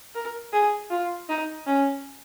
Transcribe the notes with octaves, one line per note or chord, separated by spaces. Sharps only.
A#4
G#4
F4
D#4
C#4